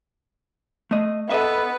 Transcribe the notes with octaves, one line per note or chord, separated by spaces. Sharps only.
A3 D#5
B3 A4 B4 D#5 E5